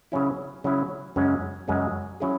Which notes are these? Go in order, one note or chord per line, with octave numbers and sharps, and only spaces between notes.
C#3 F#3 C#4 E4
C#3 F#3 C#4 E4
F#2 C#3 G#3 C#4
F#2 C#3 G#3 C#4
F#3 C#4 E4 G#4